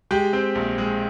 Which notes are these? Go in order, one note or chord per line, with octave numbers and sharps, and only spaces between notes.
G#3 G4 G5
C4
A#1
G#3